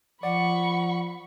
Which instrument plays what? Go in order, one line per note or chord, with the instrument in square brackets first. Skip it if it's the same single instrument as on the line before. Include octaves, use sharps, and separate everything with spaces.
[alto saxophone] F3 [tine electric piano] D5 [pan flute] F#5 [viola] B5 C#6